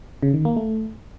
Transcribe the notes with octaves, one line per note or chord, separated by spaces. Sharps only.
C#3
D#3
A#3
A3